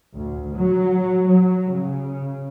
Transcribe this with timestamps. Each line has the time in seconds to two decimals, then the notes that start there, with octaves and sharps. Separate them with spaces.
0.15 D2
0.55 F#3
1.29 F#3
1.72 C#3